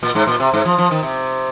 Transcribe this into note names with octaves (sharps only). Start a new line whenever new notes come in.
A#2
G#2
A#2
C3
G#2
F3
F3
D#3
C3